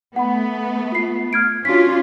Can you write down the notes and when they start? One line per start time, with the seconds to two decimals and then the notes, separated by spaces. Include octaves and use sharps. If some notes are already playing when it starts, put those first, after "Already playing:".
0.16 A3 B3 F#5 B5
0.92 F4 C7
1.33 F6 G#6 D7
1.65 C#4 D4 F4 F#4 B6